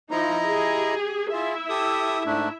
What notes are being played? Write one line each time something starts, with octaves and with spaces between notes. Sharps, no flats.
F3 D#4 E4 D#5 A#5
G4 G#4
E4 F4 G#4 E5
G4 A4 D#6
G#2 A3 D4